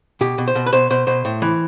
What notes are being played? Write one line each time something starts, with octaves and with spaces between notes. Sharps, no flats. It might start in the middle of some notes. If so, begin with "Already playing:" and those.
B2 G4
B2
C5
B2
B4
B2 C5
B2 C5
B2 C5
A2
E3